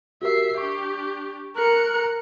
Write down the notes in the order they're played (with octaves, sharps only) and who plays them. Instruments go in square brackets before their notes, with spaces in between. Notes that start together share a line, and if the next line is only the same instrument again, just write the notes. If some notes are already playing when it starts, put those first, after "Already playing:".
[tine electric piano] F#4 G4 A#4 [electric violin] E5 C7
[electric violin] D4 G4 [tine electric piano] C#6
[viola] A#4 [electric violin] F#6 C#7